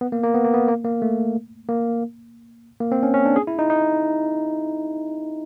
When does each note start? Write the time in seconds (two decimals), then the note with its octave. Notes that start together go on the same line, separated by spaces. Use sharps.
0.01 B3
0.12 A#3
0.23 A#3
0.34 B3
0.45 A#3
0.54 B3
0.68 A#3
0.85 A#3
1.02 A3
1.69 A#3
2.81 A#3
2.92 C4
3.03 C#4
3.14 C#4
3.26 D4
3.36 G#4
3.47 E4
3.59 D#4
3.70 D#4